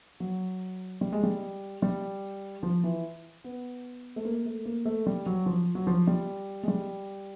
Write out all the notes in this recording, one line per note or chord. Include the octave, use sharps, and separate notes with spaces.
F#3
G3
G#3
G3
G3
F3
E3
B3
A3
A#3
A3
A#3
A3
G3
F#3
F3
F#3
F3
G3
G#3
G3